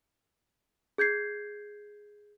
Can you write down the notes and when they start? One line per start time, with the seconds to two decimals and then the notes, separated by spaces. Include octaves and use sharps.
0.98 G#4 G6 G#6 C7